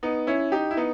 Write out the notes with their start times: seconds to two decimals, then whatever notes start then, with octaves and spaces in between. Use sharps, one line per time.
0.03 B3 D#4
0.27 C#4 E4
0.52 D#4 G4
0.71 E4
0.77 B3 D#4